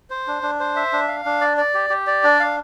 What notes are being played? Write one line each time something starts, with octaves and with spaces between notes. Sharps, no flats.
C5
D4
D4
C5
E5
D4
F5
D4
D5
D5
G4
G4
D5
D4
F5